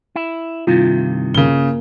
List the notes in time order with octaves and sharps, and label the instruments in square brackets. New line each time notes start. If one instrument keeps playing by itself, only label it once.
[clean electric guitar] E4
[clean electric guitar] G2 C3 D#3 [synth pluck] E4 F4
[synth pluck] G1 A#3 A#4 [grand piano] C#3 G7